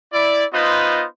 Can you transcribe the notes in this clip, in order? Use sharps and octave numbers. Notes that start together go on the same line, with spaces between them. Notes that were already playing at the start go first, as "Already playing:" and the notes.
E4 D5
B3 D#4 F4 B4 C5 D#5